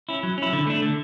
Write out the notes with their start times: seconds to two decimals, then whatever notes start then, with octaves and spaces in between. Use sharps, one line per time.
0.09 C#4 E4
0.23 F#3
0.38 C#4 E4
0.53 D3
0.67 A3 D4
0.82 D3